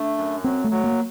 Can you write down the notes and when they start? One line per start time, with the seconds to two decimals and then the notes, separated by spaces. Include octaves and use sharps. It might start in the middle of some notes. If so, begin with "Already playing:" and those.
Already playing: A3 D4
0.18 F#2
0.44 F#3 C4
0.64 A3
0.71 F#3
0.84 A#3